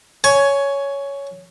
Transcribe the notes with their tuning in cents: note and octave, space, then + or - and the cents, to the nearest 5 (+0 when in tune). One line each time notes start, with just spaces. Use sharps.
C#5 +10 G#5 +15